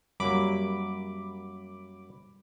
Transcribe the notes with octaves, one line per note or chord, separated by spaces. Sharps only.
F#2 F#3 G3 A#3 B5 D6